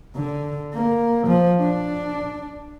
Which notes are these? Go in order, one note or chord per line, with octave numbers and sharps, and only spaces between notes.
D3
A#3
F3
D4